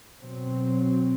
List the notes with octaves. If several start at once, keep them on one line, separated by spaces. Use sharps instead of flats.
B2 F#3 C4